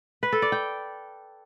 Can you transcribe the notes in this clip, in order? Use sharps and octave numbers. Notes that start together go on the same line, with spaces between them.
B4
A4
D5
G5